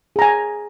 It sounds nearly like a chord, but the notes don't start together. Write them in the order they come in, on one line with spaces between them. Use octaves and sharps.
G#4 A#5 G#5